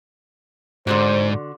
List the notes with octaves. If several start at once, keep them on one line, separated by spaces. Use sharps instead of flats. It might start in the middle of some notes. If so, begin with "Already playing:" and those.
G#2 D3 F4 F#4 C5